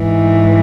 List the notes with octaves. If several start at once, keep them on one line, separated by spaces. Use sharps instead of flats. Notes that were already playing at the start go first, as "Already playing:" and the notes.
Already playing: G#2 E3